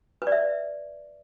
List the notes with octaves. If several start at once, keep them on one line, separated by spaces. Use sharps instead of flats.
B4
D5
E5